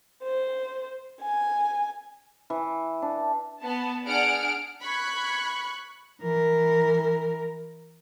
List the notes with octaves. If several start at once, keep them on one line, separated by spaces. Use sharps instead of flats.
C5
G#5
E3
D4
B3 A5
D4 G#4 D5 F#5 F6 D7
B5 C#6 F#6 G#6
E3 A#4